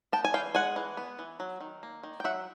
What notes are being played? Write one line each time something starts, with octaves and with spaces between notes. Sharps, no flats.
B3 G5 A5
G#5
E3 F5 G5
G#3 F#5 G#5
E3
B3
E3
F#3
D#3
A#3
D#3
G5
F#3 E5 F#5